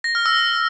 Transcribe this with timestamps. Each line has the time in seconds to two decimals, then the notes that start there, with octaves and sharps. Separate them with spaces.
0.04 A#6
0.15 F6
0.26 E6